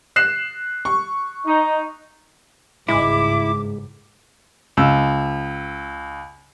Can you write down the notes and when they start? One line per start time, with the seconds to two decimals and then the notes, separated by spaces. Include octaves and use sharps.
0.16 F#6 C7 E7
0.85 C#6
1.47 D#4
2.88 G1 C#2 G#2 G#3 E4 D6
4.77 C#2 E6